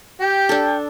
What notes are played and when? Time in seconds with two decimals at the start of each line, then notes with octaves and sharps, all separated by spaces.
0.21 G4 G5
0.49 D4 A4